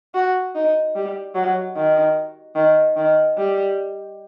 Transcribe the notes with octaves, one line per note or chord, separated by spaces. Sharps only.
F#4
D#4
G3
F#3
D#3
D#3
D#3
G3